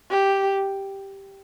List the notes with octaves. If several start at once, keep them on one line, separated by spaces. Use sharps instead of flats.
G4